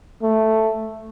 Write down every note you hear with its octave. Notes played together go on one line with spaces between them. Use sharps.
A3